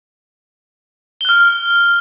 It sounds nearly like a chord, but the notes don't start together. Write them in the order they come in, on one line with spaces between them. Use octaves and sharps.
G7 F#6 F6